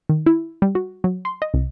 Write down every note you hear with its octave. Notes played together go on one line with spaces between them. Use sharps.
D#3
E4
G3
F#4
F#3
C6
D#5
C2